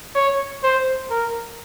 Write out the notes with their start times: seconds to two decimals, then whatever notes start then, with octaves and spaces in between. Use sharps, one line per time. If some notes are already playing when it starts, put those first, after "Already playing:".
0.15 C#5
0.63 C5
1.10 A#4